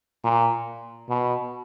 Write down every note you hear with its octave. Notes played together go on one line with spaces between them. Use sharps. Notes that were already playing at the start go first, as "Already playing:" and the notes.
A#2
B2